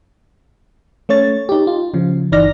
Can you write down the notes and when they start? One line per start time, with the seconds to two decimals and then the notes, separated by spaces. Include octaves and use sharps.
1.09 A3 C#4 C#5 A6
1.49 D#4 G4
1.67 F4
1.94 C#3 F3
2.32 G1 E3 D#4 D5 F6 A#6